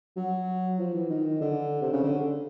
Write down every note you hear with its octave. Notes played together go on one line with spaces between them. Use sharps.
F#3
F3
E3
D#3
D3
C3
C#3
D3